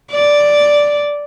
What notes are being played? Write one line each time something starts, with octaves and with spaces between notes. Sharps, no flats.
D5